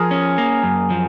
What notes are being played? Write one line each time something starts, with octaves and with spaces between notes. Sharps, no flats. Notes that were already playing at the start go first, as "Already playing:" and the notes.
Already playing: F3 G#4 A#4
C#4
A#3
F#2
F3